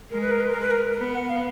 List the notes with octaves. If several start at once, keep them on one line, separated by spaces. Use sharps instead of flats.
G#3 A#4
B4
A#4
B4
A#4
B4
A#4
A#4
B3 B4
F#5
F5